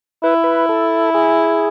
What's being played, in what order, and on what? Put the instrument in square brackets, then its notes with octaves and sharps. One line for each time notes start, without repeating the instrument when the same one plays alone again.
[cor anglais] E4 [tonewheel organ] B4
[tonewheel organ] B4
A4
G#4